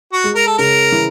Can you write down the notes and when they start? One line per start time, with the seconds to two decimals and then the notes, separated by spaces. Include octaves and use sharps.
0.13 F#4
0.24 G#3
0.35 A#4
0.47 A4
0.58 C#3 A#4
0.92 E3